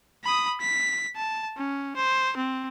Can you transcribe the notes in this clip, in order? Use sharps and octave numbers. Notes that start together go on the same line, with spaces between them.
B5 D#6
B6
A5
C#4
C5
C4